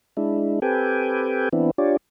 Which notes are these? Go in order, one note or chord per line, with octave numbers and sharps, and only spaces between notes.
G#3 D4 E4
C4 G4 A4 B4 G5 G#5
E3 B3 C4 D4 E4
D4 F4 G4 C#5 D5